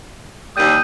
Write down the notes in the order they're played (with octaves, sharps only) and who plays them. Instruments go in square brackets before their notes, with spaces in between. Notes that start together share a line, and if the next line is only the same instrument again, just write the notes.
[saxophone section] D#2 G3 [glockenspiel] D#6 G6 D#7